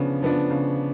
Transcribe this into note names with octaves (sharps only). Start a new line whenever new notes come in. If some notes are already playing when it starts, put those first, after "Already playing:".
Already playing: C#3 F3 B3 D4
F3 B3 D4
C#3